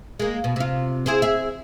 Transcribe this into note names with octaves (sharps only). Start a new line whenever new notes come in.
G#3 A#3
B2
C3 F4
E4 G#4 C5
G#4 E5